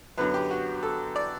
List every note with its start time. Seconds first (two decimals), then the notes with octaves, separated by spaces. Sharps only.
0.18 F#2 D3 F#3 B3 B4
0.34 G4
0.51 F#4
0.83 A4
1.16 D5